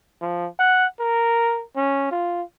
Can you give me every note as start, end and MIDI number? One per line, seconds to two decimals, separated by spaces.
0.22 0.48 53
0.59 0.86 78
1.00 1.64 70
1.76 2.11 61
2.11 2.43 65